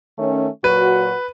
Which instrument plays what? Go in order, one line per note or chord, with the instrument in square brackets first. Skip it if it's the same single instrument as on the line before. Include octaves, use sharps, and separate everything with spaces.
[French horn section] D#3 A3 C#4
[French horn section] A#2 F#3 F#4 [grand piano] B4